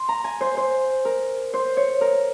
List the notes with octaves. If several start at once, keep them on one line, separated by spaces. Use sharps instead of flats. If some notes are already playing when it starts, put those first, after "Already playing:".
Already playing: C6
A#5
G#5
C5
C5
A#4
C5
C#5
A#4